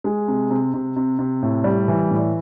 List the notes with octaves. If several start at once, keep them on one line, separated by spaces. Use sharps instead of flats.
G#3
C3
C3
C3
C3
C3
A2
G3
E3
A2